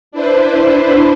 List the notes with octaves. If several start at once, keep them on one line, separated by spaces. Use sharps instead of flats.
D4 E4 B4 C5